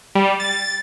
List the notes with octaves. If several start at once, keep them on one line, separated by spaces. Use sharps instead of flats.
G3
A6